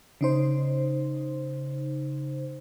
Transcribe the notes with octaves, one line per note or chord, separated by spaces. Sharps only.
C#3 D#4 C5